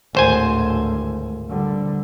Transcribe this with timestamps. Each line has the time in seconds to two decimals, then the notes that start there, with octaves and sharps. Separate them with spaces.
0.15 G#1 D2 A2 C5 G#5
1.49 D3 G3